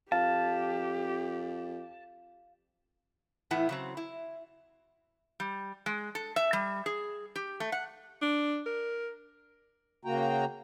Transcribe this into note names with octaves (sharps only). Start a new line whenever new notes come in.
F2 G4 F5 A5
A2 E3 B3 E4 F#5
C#3 F#3 C4
E4
G3
G#3
A4
E5
G3
G#4
G4
A3
F#5
D4
A#4
C#3 A#3 F#4 G5 A#5